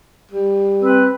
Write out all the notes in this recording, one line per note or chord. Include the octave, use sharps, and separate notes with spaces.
G3
C4 B4